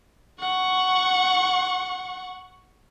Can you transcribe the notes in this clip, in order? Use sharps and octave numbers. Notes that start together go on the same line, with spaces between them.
F#5 C#6